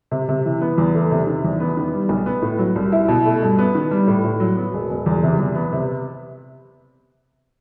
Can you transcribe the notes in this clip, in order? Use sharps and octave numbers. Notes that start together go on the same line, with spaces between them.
C3
C3
E3
B3
E2
A3
C3
D#3
E2
B3
D#3
G3
B1
B3
A2
F#3
C2
E4
B2
A3
G2
B3
D#3
G3
A2
A2
F#3
B3
E1
E1
E2
C3
E2
B3
C3